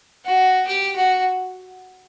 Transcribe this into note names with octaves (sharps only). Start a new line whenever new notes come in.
F#4
G4
F#4